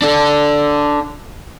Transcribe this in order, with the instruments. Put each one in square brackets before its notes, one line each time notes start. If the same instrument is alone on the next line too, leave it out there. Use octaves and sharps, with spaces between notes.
[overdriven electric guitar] D4 A4